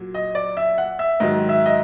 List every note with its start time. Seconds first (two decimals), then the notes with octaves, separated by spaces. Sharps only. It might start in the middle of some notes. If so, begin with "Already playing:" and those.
Already playing: A#2 F#3
0.14 D#5
0.35 D5
0.57 E5
0.78 F#5
0.99 E5
1.20 G#2 D#3 F#3 D#5
1.49 E5
1.66 D#5